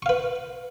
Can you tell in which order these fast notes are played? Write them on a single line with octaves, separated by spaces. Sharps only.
C#6 F5 B4